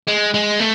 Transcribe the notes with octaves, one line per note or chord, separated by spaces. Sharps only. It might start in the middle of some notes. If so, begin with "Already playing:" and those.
G#3
G#3
A3